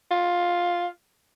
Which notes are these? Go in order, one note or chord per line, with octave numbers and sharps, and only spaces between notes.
F4